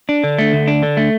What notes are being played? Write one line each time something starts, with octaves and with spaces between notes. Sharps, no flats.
D4
D3
A3
D2
D4
D3
A3